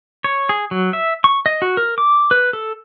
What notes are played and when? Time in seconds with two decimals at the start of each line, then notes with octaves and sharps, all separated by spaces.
0.24 C#5
0.49 G#4
0.71 F#3
0.93 E5
1.24 C#6
1.46 D#5
1.62 F#4
1.77 A#4
1.98 D6
2.31 B4
2.53 A4